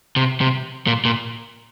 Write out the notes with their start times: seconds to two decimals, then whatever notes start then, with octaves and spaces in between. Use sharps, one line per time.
0.16 C3
0.41 C3
0.87 A#2
1.05 A#2